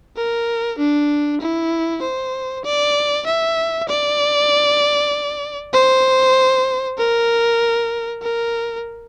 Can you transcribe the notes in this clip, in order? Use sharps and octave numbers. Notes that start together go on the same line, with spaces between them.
A#4
D4
E4
C5
D5
E5
D5
C5
A#4
A#4